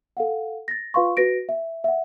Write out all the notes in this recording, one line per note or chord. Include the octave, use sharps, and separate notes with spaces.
A4 F5 F#5
A6 A#6
F4 B4 F5 C6 C#6
F#4 B4 A#6 D7
E5
E5 F#5